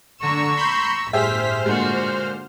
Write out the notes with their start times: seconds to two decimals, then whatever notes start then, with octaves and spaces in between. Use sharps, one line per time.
0.23 D3 A#5 C#6 E6
0.57 B5 C6 G6
1.13 G1 A2 G4 G#4 C5 E5 F6 B6
1.66 A#2 D3 G#3 F#4